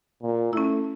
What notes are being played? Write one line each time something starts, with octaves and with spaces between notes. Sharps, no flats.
A#2
A3 C#4 E4